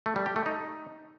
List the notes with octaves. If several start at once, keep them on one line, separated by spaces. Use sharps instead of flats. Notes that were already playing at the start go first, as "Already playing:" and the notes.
A3
G3
G4
A3
D#4